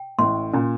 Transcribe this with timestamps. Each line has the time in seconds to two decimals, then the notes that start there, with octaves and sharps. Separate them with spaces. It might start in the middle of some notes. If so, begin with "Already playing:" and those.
Already playing: G5
0.18 A1 A2 C6
0.54 A#2 C#4